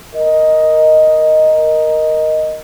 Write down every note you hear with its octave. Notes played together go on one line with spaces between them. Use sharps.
A#4 D#5